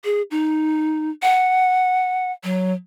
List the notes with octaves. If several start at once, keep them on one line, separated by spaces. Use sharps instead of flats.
G#4
D#4
F#5
F#3